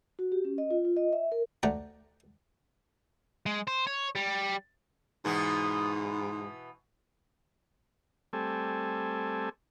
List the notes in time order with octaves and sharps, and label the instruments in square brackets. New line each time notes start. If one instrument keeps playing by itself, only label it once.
[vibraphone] F#4
G4
C#4
D#5
F4
F4
D#5
E5
A#4
[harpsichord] D2 A3 D5 F#5 G5 A#5
[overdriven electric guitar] G#3
C5
C#5
G3
[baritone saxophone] G#2 [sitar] B2 E3 B3
[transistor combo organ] G3 A3 C4 A4 G#5